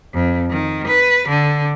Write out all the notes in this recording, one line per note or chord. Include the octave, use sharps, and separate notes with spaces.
F2
D#3
B4
D3